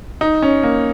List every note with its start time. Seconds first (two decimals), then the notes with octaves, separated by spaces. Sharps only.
0.21 D#4
0.42 C#4
0.63 A#3